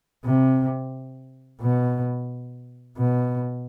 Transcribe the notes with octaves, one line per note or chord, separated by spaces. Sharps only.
C3
B2
B2